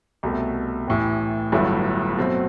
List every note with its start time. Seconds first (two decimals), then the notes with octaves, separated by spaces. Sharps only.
0.23 C2 B2 A3
0.88 A1 A2 E3
1.52 G1 G2 F#3 A3 E4
2.18 B2 F#3 A3 C4